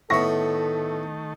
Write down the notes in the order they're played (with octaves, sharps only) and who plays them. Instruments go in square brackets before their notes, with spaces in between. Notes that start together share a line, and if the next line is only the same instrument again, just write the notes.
[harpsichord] A2 B3 [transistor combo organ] D#3 A3 [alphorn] A4 [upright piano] E5 C#6 A#6